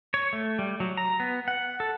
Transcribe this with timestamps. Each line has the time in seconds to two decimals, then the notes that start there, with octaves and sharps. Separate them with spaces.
0.14 C#5
0.33 A3
0.59 G3
0.80 F#3
0.97 A#5
1.20 B3
1.48 F#5
1.80 A4